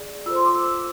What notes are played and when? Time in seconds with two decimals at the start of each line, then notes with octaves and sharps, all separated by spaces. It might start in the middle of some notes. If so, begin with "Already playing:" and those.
Already playing: G#4 D5
0.26 F4 A4 C5 E6
0.35 C6
0.46 D6
0.55 E6
0.66 E6